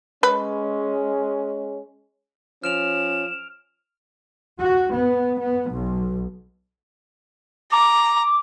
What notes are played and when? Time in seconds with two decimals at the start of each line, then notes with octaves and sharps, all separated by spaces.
0.23 G#3 C#4 B4
2.64 F3 C#4 F6 D7 E7 F7
4.59 F#4
4.94 B3
5.40 B3
5.70 B1
7.72 A#5 D6